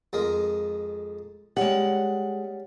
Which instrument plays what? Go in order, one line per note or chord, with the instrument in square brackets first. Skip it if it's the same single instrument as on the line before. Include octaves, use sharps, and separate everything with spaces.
[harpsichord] F2 G#3 A#4
[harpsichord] G3 C#4 [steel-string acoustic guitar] G#3 F#5